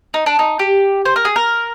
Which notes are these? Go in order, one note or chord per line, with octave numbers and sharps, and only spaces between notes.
D#4
D4
D#4
G4
C5
A#4
G#4
A#4